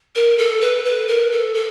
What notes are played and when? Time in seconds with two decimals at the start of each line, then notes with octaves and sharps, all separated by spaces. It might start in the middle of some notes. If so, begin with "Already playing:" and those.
0.15 A#4
0.38 A4
0.61 B4
0.85 B4
1.08 A#4
1.32 A4
1.55 A4